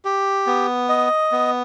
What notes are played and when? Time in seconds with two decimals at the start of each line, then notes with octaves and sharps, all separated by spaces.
0.05 G4
0.47 B3
0.89 D#5
1.32 B3